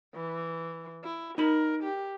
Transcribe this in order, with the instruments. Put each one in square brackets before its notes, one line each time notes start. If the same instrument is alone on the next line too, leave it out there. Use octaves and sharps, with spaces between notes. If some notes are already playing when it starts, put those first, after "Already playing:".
[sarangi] E3
E4
[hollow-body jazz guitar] D#4 B5 [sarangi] A#4
[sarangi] G4